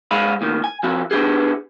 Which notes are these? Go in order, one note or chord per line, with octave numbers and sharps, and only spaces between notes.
G#2 G#3 D#5 F5 B5
D#2 A2 D#3
G#5
F3 C4 E4 F#4
B3 D4 E4 G4 G#4